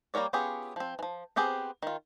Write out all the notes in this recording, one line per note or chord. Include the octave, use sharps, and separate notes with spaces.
G3 A#3 A#4 C#5 D5
B3 C#4 F4 G4 G#4
F3 C4
E3 F3
B3 C4 G4 G#4 C5
D#3 F4